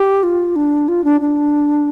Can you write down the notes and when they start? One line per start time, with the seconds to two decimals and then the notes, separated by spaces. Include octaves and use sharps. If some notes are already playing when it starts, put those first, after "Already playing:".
Already playing: G4
0.23 F4
0.56 D4
0.88 F4
1.04 D4
1.21 D4